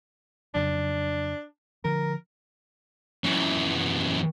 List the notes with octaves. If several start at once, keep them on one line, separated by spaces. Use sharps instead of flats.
F2 C#3 F#3 D4
D3 F3 A#4
F#2 E3